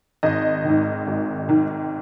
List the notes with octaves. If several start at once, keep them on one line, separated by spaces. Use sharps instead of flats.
G#1 D#5
G#2 D#3
G#1
G#2 D#3